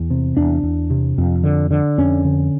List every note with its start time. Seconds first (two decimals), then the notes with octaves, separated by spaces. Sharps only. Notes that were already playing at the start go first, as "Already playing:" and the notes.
Already playing: E2
0.10 C3
0.37 E2 D4
0.63 E2
0.90 C3
1.18 F2
1.44 D3
1.71 D3
1.98 F2 C#4
2.25 D3